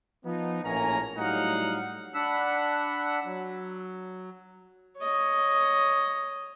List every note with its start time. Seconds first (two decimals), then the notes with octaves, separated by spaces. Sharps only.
0.24 F3 B3 D#4
0.64 A#1 A2 A#3 C#4 G#5 A#5
1.17 A2 F#3 G3 D#4 F5 F#5
2.14 D4 F#5 B5 E6
3.25 F#3
4.98 C#5 D#5